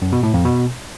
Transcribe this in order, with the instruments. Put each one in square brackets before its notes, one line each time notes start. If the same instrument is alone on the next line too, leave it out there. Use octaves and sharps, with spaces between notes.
[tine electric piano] F#2
B2
A2
F2
B2